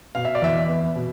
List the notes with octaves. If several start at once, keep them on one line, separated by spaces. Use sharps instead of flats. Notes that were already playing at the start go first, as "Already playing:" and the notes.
B2 F5
E5
D5
E2 E5
B3
B2